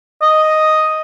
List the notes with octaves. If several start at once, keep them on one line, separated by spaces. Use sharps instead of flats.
D#5